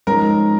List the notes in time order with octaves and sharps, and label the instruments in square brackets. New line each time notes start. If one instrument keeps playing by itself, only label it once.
[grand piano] G#2 F3 G#3 C#4 [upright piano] A#4